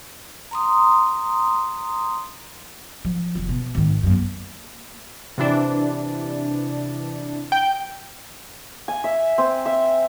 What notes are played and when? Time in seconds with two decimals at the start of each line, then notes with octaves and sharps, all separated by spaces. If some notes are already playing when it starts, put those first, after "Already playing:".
0.51 A#5 C6 D#6
3.05 F3
3.35 F1 F4
3.49 B2
3.75 G#1 D#3
4.03 F#2 A#3
4.18 A#3
5.38 C3 E3 D4
7.52 G5
8.88 G#5
9.04 E5
9.38 C4
9.66 E5